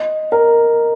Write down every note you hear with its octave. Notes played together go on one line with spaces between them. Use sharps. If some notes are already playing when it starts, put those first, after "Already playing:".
Already playing: D#5
A#4